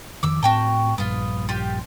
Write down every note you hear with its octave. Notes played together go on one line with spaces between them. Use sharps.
F2 D#3 D6 E6
A2 C4 F#4 G5 A5
A#1 G2 B3 F4
F4 G4